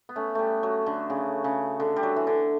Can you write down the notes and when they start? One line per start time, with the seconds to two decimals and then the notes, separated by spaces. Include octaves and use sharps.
0.09 B3
0.16 A3 C#4
0.35 G3 A3
0.63 F#3
0.86 D3
1.10 C#3
1.44 C#3
1.80 D3
1.96 G3
2.03 F#3
2.16 E3
2.27 D3